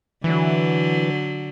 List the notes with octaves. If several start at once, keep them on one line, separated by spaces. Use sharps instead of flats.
D3 E3 F#3